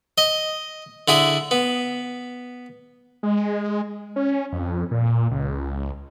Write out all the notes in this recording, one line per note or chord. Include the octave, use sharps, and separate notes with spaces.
D#5
D3 E4 G#4
B3
G#3
C#4
F2
A#2
C#2